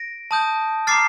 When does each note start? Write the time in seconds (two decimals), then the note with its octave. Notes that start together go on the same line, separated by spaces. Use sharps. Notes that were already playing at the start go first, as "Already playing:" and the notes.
Already playing: A#6 D7
0.31 A5 D#6 G6
0.87 A#5 D6 F6 A6 C7